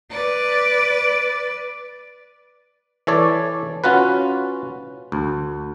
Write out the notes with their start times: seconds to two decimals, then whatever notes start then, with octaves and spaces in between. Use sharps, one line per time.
0.12 B4 D5
3.07 E3 A4 C#5 D5
3.84 C#4 F4 F#4 B4
5.12 D2